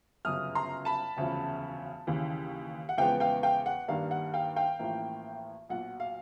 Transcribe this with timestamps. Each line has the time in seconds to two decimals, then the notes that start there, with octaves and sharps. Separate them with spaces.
0.25 G1 F#2 C#3 D#6 F6
0.55 A#5 C6
0.85 A5 B5
1.17 E1 D2 C#3 F3
2.07 D#2 C#3 E3
2.89 F#5
2.98 E2 C#3 F3 G#3 B3 F5 G5
3.20 F5 G5
3.43 F5 G5
3.66 F#5
3.88 G2 D#3 G3 A#3 D4 F5
4.11 F#5
4.34 F5 G5
4.56 F5 G5
4.79 A1 A2 F3 A#3
5.69 B1 A#2 F#3 F#5
6.00 F5